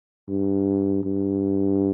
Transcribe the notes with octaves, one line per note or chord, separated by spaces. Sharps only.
G2
G2